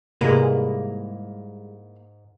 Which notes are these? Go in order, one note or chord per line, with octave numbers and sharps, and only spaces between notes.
G#2 C3 G3 G#3 A#3 E4 B4